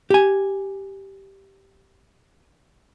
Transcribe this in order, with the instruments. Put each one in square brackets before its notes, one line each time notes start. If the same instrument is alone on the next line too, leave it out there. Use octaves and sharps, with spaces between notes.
[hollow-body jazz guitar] G4 G#5